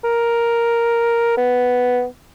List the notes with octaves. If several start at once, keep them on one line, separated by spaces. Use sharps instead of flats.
A#4
B3